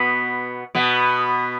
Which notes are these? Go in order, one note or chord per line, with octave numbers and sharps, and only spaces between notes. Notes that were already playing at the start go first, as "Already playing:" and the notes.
Already playing: B2 B3
B2 B3